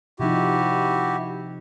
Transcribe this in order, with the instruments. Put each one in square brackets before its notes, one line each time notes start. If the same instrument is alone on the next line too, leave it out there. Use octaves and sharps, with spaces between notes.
[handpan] C3 F3 D#4 [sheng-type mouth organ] E4 F#4 G4